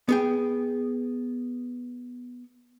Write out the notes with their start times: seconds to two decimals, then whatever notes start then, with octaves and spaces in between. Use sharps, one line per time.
0.09 B3 G#4 G5